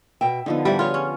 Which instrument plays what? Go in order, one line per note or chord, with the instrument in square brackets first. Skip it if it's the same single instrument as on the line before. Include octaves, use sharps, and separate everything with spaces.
[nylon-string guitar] B2 G5 [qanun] E5
[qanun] D3 F3 B3 [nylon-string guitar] D#4
[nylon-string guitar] G#2 E4 [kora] G3
[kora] F4 [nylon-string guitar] G#4 C#5
[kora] C#4